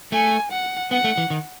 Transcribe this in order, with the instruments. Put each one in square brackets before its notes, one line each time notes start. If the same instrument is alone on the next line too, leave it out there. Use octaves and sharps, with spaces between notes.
[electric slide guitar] A3 [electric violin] G#5
[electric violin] F#5
[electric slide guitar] B3 [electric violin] F#5
[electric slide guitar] A3
E3
D#3